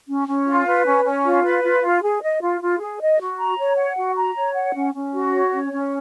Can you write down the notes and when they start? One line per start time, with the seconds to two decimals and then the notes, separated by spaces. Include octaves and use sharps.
0.07 C#4
0.27 C#4
0.46 F4
0.66 B4
0.85 C#4
1.04 C#4
1.24 F4
1.44 B4
1.63 F4
1.82 F4
2.02 G#4
2.21 D#5
2.41 F4
2.61 F4
2.79 G#4
2.99 D#5
3.19 F#4
3.39 A#5
3.57 C#5
3.76 F#5
3.96 F#4
4.16 A#5
4.36 C#5
4.54 F#5
4.74 C#4
4.94 C#4
5.13 F#4
5.33 C#5
5.52 C#4
5.72 C#4